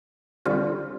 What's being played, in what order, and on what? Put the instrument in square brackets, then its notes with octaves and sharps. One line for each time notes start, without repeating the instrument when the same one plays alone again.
[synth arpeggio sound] D3 G3 C4 F4